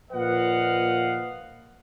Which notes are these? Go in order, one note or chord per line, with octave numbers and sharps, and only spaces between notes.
A#2 F3 B4 D#5 F5 F#5